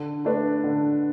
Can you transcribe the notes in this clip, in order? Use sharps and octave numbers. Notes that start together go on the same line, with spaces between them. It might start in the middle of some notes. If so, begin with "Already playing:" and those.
Already playing: D3
A3 D4 B4
D3